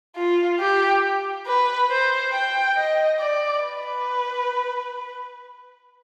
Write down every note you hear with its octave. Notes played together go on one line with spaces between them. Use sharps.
F4
G4
B4
C5
G5
D#5
D5
B4